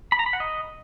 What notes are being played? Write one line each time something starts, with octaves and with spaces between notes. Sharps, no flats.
B5
A#5
B5
F#5
D#5